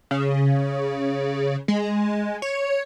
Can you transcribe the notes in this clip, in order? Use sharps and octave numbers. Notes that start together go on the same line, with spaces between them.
C#3
G#3
C#5